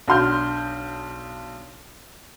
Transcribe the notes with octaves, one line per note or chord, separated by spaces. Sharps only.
B1 D4 F#4 C6 F6 G6